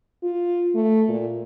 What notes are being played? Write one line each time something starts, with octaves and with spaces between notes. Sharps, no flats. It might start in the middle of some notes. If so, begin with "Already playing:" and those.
F4
A3
A#2